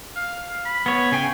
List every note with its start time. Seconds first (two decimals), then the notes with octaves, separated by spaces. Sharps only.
0.16 F5
0.66 B5
0.86 B3 C#5
1.12 C#3 G5 G#5